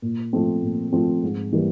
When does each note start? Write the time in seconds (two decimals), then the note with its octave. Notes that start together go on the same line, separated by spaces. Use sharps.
0.02 A#2
0.33 F3 A3 C4
0.63 A#2
0.92 F3 A3 C4
1.22 G#2
1.52 E3 G3 A#3